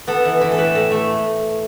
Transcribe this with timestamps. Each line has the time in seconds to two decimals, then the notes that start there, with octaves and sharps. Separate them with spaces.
0.07 B3 A4
0.25 E3
0.41 E3
0.52 A4
0.58 A2 B4
0.75 A2
0.92 A3